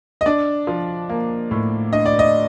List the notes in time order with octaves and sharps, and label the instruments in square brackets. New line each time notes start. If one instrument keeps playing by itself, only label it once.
[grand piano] D#5
D4 D5
F3
A#3
A2
D4 D#5
D5
D#5